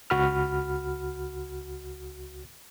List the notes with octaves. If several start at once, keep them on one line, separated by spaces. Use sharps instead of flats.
C#2 F#4 B5 F6